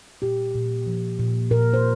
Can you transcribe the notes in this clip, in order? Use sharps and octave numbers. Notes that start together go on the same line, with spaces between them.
A#2 G4
A#2
F3
A#2
A#2 A#4
C5